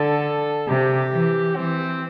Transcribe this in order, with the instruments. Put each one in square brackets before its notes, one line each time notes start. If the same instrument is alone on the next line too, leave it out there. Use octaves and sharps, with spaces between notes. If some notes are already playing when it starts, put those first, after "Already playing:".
Already playing: [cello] D3 [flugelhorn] A4
[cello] C3 [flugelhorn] G4
[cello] E3
[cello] E3 [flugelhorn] C4